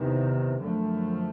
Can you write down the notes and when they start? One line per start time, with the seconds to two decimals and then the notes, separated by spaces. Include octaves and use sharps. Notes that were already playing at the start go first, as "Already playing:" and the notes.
Already playing: E2 C3 D#3
0.60 F#2 D3 F3 A3